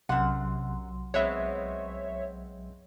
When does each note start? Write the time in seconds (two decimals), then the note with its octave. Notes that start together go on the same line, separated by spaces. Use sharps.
0.09 B1 F#2 C3 F#3 F#5 C6
1.14 G#3 B3 C4 C#5 E5